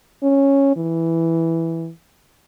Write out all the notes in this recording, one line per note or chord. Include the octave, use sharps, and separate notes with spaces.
C#4
E3